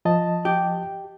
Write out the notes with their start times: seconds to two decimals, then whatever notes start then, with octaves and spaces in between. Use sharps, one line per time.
0.05 F3 D#5 A5
0.45 G4